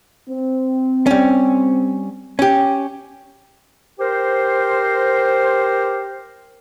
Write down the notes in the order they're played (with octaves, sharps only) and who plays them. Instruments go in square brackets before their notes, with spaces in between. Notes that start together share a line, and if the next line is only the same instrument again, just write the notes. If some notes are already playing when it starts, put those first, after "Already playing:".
[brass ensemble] C4
[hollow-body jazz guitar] G3 C#4
C#4 G4
[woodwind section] G4 A#4 C5